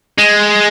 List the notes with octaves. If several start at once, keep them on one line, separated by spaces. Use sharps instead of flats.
G#3